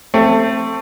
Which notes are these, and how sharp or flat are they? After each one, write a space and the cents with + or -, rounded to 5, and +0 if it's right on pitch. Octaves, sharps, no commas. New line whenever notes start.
A3 +20 C4 +0